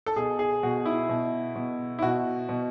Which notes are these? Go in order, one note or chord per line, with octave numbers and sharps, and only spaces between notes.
A4
B2 G#4
G#4
B2 F#4
E4
B2
B2
E4
B2 F#4
B2